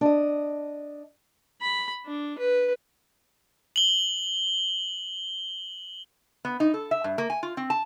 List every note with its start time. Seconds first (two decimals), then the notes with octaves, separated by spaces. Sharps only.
0.01 D4 D#5
1.61 B5
2.06 D4
2.38 B4
3.76 F#7 G7
6.45 B3
6.60 D#4
6.74 A4
6.91 E5
7.04 G2
7.18 A#3
7.30 G#5
7.43 F4
7.57 C4
7.70 A5